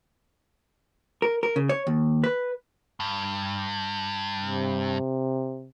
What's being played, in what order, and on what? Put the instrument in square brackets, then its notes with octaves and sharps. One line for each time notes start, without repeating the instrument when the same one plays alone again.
[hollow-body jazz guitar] A#4
A#4
C#3
C#5
D#2
B4
[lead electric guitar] G2
[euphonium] C3